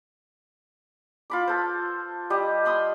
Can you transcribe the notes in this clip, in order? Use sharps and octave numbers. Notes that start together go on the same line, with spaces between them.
F4 B5 D6
A4 C5
G3 G4 D#5
B5 C6 D#6